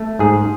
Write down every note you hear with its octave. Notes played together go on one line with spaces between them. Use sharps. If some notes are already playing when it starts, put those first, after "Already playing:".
Already playing: A3
G#2 G#4